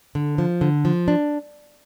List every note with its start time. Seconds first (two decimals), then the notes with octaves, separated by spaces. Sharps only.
0.15 D3
0.38 F3
0.61 D3
0.85 F3
1.08 D4